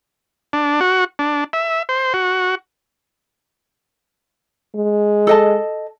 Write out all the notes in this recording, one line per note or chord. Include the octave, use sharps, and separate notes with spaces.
D4
F#4
D4
E5
C5
F#4
G#3
A4 D#5 A5